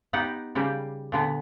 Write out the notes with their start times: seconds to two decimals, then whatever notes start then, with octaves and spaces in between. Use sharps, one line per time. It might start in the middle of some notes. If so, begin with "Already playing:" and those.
0.13 B3 D#4 G4 F#5
0.55 C#3 G3 A#3 G4
1.12 A#2 D3 B3